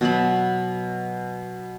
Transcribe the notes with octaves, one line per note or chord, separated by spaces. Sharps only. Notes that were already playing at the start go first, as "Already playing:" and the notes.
B2 F#3 A5 B5